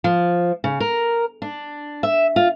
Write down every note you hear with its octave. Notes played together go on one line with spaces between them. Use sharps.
F3
C#3
A#4
D4
E5
F4